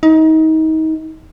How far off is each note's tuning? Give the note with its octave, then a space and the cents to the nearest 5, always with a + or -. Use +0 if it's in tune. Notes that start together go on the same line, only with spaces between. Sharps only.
D#4 +30